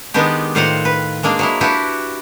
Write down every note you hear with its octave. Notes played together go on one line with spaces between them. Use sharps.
D#3 G#3 B3 D4 G4
A2 D#3 F4 C5 F5 F#5
B4
G#3 A#3 D4 G#4
F#3 G#3 E4
D4 E4 F#4 G4 B4